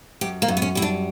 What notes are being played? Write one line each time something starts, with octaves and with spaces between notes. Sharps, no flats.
F#2 G4
A#3
F#2
B3
C#4
G3 E4
D4